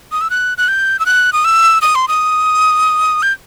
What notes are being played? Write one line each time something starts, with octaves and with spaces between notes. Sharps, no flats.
D#6
E6
F#6
F#6
G6
E6
F#6
D#6
E6
D#6
C6
D#6
G6